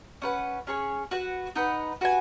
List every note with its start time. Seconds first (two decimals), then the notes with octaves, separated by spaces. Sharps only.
0.22 C#4 B4 F#5
0.67 C#4 G#4 C#5 G#5
1.11 F#4 B4 F#5
1.56 D#4 B4 F#5
2.01 F#4 B4 G#5